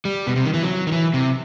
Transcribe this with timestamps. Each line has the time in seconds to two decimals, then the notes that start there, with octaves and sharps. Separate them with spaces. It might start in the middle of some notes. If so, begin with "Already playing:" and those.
0.05 G3
0.27 B2
0.36 C3
0.45 D#3
0.54 E3
0.63 F#3
0.87 D#3
0.92 E3
1.14 C3